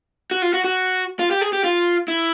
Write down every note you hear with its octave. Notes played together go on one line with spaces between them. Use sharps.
F#4
F4
F#4
F#4
F4
G4
G#4
G4
F4
E4